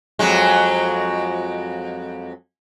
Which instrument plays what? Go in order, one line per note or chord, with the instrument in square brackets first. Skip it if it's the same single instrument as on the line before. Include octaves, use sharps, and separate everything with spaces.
[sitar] F2 F#3 G#3